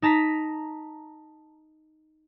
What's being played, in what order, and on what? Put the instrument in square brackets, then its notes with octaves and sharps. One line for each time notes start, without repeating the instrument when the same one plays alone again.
[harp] D#4 A5 A#5 B6